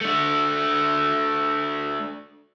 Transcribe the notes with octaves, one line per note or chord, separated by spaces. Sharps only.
A3 D4